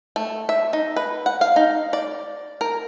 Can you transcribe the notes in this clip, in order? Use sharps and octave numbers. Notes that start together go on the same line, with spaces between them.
A3
E5
D#4
B4
F#5
F5
D#4
D5
A#4